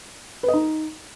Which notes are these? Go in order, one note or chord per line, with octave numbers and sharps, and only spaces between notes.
B4
D#5
D#4